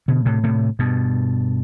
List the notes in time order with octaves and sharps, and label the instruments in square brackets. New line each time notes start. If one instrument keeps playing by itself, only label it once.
[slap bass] B2 D3
A2 C3
A2 C3
G2 B2